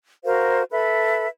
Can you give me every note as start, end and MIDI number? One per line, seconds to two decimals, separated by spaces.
0.24 0.63 66
0.24 0.63 70
0.24 0.63 72
0.24 0.63 77
0.70 1.27 69
0.70 1.27 71
0.70 1.27 76
0.70 1.27 83